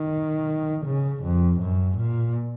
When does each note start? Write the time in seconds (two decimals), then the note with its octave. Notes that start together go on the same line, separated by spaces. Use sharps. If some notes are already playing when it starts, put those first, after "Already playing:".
Already playing: D#3
0.86 C#3
1.24 F2
1.61 F#2
1.98 A#2